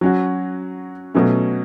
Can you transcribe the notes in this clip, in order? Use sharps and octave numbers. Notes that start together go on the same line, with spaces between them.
F#3 C#4 F#4
B2 F#3 A3 C#4